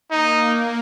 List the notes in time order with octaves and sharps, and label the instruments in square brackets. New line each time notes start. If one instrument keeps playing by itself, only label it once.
[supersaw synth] A#3 [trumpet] D#4